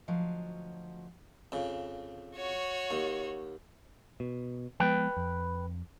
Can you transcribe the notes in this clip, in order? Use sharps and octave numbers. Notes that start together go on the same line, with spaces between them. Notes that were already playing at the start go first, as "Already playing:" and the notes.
D2 F3 F#3 F#4 D#5 F5
F2 C#3
F#4 C#5
D#2
B2
F3 G#3 B3 B4 G5
F2